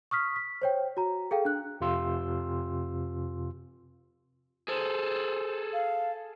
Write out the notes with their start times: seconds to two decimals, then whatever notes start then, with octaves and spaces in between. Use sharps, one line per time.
0.11 C#6 D#6 F6 B6
0.36 B6
0.62 C5 C#5 G5
0.97 F#4 A#5
1.31 G#4 A4 F5 G5
1.45 D4 F#6
1.81 F2 C3 F4 C6 E6
4.68 G#4 A4 C5
5.73 F5